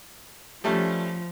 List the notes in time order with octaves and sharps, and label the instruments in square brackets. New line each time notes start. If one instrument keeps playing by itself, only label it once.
[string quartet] F3 [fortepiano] G3 A3 C#4